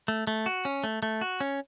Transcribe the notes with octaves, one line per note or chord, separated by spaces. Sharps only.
A3
A3
F#4
C#4
A3
A3
F#4
C#4